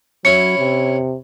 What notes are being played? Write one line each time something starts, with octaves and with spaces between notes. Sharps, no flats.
F#3 C#4 E4 C#7
C3